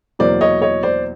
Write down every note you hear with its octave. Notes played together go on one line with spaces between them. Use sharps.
E2 B2 F#3 A#3 C5 D5
C#5 D#5
C#5 D#5
C5 D5